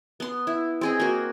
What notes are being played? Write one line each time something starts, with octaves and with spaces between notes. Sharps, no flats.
B3 C6
E4
C4 G#4 D#5
A#3 F#4